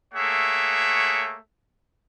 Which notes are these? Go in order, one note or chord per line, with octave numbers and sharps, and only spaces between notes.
A3 A#3 G#4 C#5 E5 F#5